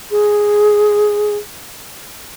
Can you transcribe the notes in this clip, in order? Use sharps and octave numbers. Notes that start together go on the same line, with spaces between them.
G#4